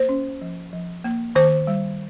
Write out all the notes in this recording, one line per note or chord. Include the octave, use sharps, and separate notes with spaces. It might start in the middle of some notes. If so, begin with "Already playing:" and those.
Already playing: A#3 C5
C#4
F3
F3
A#3
D#3 C5
G3